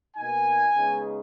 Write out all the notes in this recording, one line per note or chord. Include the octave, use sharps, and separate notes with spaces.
B2 A#3 D#4 G#5
C#3 G#3 B3 D#4